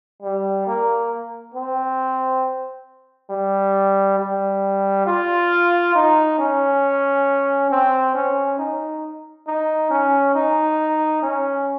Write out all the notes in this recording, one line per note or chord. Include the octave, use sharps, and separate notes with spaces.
G3
A#3
C4
G3
G3
F4
D#4
C#4
C4
C#4
D#4
D#4
C#4
D#4
C#4